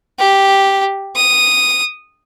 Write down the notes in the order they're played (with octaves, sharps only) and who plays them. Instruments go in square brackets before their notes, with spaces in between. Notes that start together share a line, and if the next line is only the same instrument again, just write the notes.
[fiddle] G4
D#6